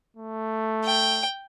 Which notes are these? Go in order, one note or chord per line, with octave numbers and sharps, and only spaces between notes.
A3
G5